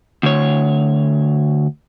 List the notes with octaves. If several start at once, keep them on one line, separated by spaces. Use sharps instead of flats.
D2 C#5